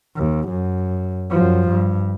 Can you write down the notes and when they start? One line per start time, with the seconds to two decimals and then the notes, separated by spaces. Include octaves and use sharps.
0.16 D#2
0.48 F#2
1.31 F#2 F3
1.69 G2